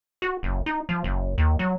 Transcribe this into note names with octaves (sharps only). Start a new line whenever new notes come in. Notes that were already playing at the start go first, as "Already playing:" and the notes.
F#4
F#1
D#4
F3
F#1
D#2
F#3